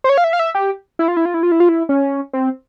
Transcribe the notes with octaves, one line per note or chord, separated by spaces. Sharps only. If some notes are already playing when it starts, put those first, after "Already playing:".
C5
C#5
F5
E5
F5
E5
G4
E4
F4
E4
F4
E4
F4
E4
F4
E4
C#4
C4